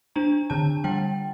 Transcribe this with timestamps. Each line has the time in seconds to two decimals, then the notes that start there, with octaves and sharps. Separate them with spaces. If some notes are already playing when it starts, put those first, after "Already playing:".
0.16 D4 A#5
0.50 D3 A5
0.84 G3 G5